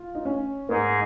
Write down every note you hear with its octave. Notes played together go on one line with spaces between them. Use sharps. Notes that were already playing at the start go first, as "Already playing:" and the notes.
Already playing: F4
D#4
C#4
G#2 G#3 A#3 D#4 G#4